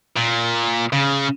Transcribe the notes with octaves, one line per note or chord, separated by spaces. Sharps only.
A#2
C#3